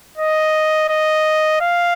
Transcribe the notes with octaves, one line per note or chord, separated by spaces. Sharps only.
D#5
D#5
F5